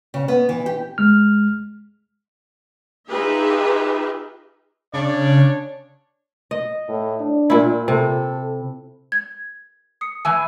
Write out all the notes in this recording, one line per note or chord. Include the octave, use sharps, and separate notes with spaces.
C#3
B3
E3
G4
G#3 F6
D#4 F4 G4 G#4 B4 E5
C#3 D4 C#5 D5
D#5
A2
D4
A#2 E4
C3 A4
G#6
D#6 C7 C#7
A2 E3 G#5 E6